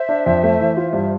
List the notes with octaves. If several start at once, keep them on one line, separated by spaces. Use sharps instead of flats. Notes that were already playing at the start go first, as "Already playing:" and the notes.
Already playing: C5 E5
D4
F2
A3
E3
F4
G2